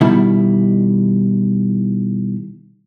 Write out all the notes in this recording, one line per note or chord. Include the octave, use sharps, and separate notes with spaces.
B2 D#3 G3 E4